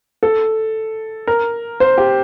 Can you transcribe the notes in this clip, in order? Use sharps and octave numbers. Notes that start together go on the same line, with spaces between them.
A4
A#4
C5
G4